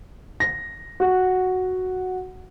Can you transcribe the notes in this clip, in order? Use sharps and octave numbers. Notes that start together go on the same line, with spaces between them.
A#6
F#4